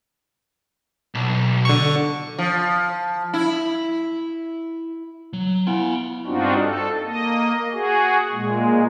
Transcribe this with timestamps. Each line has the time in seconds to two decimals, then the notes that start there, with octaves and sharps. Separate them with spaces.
1.15 B1
1.65 D3 C#6
2.38 F3
3.33 E4
5.33 F#3
5.67 B3 E4 F5 G#5
6.26 G2 C4 D4 D#4 F4 F#4
6.62 A4
7.04 A#3 D#5
7.72 F#4 G#4
8.32 A#2 G#3